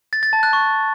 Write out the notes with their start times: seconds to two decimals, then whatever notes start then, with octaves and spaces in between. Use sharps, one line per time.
0.13 A6
0.23 A6
0.33 A5
0.43 F#6
0.53 C#6